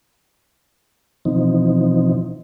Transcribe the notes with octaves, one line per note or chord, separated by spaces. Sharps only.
B2 E3 F3 C4 D#4